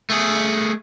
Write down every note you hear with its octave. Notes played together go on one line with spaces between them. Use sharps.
A3 G#4